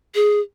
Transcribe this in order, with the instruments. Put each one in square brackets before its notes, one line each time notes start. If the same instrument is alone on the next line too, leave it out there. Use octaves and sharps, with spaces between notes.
[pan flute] G#4